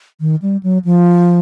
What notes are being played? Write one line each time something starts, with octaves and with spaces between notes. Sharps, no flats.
D#3
G3
F#3
F3